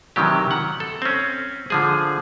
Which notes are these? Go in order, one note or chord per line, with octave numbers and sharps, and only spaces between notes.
C3 D#3 E3 F#3 G4
F#5
A4
C4 C#4
D3 F3 G#4